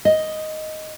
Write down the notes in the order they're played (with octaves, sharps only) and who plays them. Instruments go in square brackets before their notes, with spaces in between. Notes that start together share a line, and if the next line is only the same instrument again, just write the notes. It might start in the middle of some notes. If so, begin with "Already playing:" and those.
[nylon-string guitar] D#5